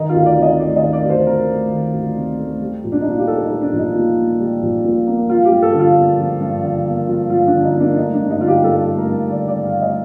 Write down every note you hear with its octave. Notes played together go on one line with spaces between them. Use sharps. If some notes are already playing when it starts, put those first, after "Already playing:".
Already playing: D#3 D#4
F4
D2
D5
C3
D#5
A3 D5
D#5
D#3
D5
D2
C5
C3 A#4
A3
D#3
D2
C3
A3
G3
A#1
D4
D#4
A#2 F4
G4
A#3 A4
D#4
G3
D4
A#1
D#4
A#2
A#3
G3
A#1
A#2
A#3
F3 F4
G4
G2
A4
D3
F4
A#3
F3
G2
D3
A#3
F3
G2 F4
D4
D3
D#4
A#3
D4
A3 D#4
D4
G2
D#4
D3 F4
G4
G2 A4
A3
A#4
G2
D3 D5
D5
G2
F5
A3
D#5